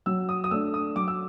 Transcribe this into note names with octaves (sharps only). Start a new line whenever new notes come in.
F#3 E6
D#6
D#6
A3 D4 E6
D#6
F#3 D6
E6